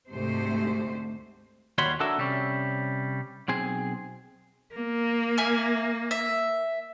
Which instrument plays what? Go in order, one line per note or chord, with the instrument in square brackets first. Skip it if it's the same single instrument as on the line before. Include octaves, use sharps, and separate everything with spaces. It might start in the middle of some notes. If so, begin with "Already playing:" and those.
[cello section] D2 G#2 C3 A3 C5
[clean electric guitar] D#2 G3 F#4 C#5 B5 C6
D4 F#4 A4 A#4 E5
C3 G3 C#4
B1 C4 G#4
[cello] A#3
[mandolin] E5 G#5 F6
E5